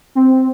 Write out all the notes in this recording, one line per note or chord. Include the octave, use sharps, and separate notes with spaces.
C4